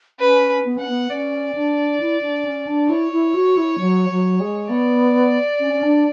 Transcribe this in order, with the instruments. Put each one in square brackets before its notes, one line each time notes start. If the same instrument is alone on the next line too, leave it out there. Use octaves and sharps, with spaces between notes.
[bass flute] C#4 [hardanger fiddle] B4
[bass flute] B3
[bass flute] C#4 [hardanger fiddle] F#5
[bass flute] B3
[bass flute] C#4 [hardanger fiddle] D5
[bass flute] D4
E4
D4
C#4
D4
[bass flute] E4 [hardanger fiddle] C#5
[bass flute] E4
F#4
E4
F#3
F#3
G#3
[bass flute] B3 [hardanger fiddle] D5
[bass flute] C#4
C#4
D4